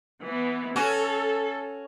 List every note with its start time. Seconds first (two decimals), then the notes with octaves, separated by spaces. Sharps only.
0.23 E3 B3
0.76 C#4 F#4 A4